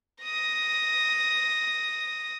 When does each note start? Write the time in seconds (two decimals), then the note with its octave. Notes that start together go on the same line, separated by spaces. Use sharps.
0.23 D#6 A#6